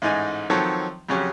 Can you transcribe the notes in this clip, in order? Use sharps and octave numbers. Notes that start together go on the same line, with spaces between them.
A1 G#2 D#4 G#5
D#3 F3 F#3 C4 A4 C#5
F2 C#3 F#3 C#4 G4